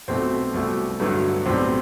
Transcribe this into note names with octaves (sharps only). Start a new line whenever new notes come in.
B1 B2 A3 C4
C2 B2 A3
G2 D3 F#3 A3 B3
B1 A2 G3 C4